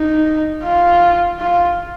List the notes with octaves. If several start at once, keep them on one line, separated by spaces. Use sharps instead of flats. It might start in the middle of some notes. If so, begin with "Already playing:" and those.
Already playing: D#4
F4
F4